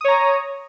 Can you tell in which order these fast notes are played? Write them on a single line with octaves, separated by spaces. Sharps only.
D#6 C#5 A#5